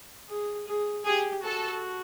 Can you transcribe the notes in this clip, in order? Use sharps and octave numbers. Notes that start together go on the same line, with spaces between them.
G#4
G#4
G4 G#4
F#4 A4